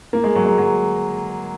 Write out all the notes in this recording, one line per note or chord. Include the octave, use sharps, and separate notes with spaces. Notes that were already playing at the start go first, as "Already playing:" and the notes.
A#3
G#3
F#3
G#3
F#3